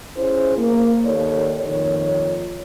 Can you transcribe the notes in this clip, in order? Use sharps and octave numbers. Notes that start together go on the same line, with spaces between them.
C#4 E4 G#4 C5
A#3
D#2 A4 C#5 D5
F2 A#2 D#3 C#5